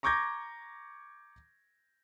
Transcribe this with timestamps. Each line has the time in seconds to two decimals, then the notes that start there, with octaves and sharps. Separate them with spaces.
0.03 A#5 C#6 D6 G6 G#6 A#6